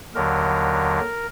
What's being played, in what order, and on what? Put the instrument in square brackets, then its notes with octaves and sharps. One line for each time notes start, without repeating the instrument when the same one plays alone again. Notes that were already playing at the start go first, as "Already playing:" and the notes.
[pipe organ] D#2 D3 F#3 A#4